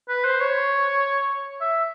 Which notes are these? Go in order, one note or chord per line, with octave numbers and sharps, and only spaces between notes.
B4
C5
C#5
E5